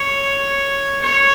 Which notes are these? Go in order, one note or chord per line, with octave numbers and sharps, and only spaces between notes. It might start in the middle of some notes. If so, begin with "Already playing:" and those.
Already playing: C#5
C#5